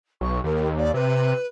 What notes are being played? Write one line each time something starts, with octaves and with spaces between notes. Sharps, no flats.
B1 C#6
D#2 A#4
D5
C3 B4